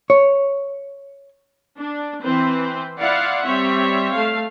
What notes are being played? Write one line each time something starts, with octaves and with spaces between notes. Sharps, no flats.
C#5
D4
E3 C4 B4 C5
E4 F4 D5 F5 F#5
G3 C4 C#5 E5
A3 F5